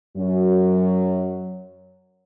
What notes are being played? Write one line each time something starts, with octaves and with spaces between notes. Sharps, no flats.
F#2 F#3